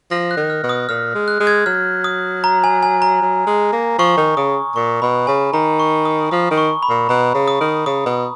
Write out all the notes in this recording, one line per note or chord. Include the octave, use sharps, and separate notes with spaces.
F3 A#6
F#6
D#3
F6
B2
D#6
A#2 F6
G#3
F#6
G#3
G#6
F#3 F6
D#6
A#5
G#5
G#5
A#5
F#3
G#3
A#3
F3 C#6
D#3
C#3 D#6
A#2 C#6
B2 B5
C#3 G#5
D#3 A#5
C#6
D#6
F3 D#6
D#3
C#6
B5
A#2
B2 A#5
C#3
D#6
D#3
C#3 D#6
B2